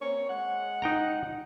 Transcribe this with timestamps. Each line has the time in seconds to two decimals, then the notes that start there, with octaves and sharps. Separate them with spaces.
0.01 A#3 C4 C#5
0.29 G#3 F#5
0.82 D#4 G5 A#5